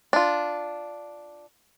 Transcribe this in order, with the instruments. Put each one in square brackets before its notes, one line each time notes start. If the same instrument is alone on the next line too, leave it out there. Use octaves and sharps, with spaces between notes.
[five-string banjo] D4 F4